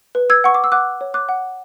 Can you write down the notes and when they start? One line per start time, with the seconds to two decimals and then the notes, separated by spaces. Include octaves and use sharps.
0.15 B4
0.30 E6 G#6
0.44 F#5 C#6
0.54 D6
0.64 E6
0.72 F#5 D6 F#6
1.01 C#5
1.14 D6 F#6
1.29 F#5